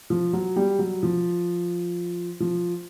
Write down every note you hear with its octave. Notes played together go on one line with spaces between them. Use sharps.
F3
F#3
G3
F#3
F3
F3